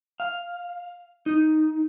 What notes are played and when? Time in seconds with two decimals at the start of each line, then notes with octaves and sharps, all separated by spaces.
0.20 F5
1.26 D#4